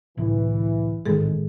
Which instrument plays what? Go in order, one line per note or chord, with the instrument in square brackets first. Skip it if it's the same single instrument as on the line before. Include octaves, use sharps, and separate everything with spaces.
[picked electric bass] C2 A2 D3 [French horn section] E3
[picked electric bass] A1 G#2 C4 [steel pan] D#3 G#3 [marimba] G#4 A4